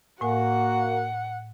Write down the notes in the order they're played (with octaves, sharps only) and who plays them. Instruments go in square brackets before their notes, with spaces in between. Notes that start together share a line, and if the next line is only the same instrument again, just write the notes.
[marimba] A2 G#5 [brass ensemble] A#3 F#4 [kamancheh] F#5